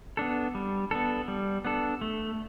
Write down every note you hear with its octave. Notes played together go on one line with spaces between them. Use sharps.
B3 D4 A4
G3
B3 D4 A4
G3
B3 D4 A4
A3